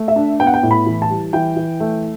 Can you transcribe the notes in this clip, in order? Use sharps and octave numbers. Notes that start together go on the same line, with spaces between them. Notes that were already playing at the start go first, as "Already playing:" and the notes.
Already playing: A3
E5
D4
B3 G5
F#5
G5
A2
B5
E3
A5
G3
E3 G5
E3
A3